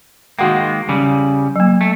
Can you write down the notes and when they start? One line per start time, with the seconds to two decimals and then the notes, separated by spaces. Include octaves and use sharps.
0.39 D#3 G#3 A#3 F#4 F#5 G5
0.89 C#3 G3
1.56 F#3 A#3
1.81 A3